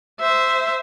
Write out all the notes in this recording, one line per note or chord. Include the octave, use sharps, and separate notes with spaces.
C5 E5